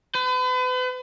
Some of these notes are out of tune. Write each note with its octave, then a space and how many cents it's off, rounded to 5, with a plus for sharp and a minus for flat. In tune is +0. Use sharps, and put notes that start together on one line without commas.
B4 +40